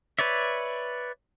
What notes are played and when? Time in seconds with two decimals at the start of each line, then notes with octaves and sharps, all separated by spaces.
0.19 B4 C#5 D5 E5